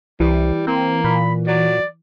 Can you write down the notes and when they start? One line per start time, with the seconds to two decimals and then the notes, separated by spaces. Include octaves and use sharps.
0.20 C2 E3 G3
0.67 A#3 C4
1.04 A#2 B5
1.47 F#3 D5